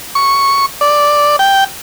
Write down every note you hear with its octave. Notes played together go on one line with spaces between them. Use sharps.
C#6
D5
G5